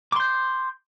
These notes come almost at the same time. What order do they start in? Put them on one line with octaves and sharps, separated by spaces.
D6 C6 G6